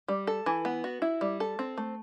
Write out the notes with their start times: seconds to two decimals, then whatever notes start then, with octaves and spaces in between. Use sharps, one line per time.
0.08 G3
0.27 A4
0.46 E3
0.65 B3
0.84 F#4
1.02 E4
1.21 G3
1.40 A4
1.59 C4
1.78 A3